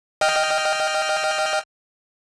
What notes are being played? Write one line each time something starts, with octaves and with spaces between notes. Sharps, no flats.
D#5 G5 F6